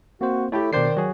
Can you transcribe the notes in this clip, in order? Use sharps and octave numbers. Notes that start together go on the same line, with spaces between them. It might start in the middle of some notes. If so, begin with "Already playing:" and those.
A#3 C4 F#4 C5
A3 E4 G4 A4 C#5 G5
B2 D#3 D4 C5 D5 C7
F#3 F#4 G#4 C#5